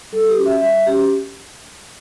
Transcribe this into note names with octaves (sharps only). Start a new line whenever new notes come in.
G3 A4
G4
C#4 F#4
E5
G3 E5
C#4 F#4 G4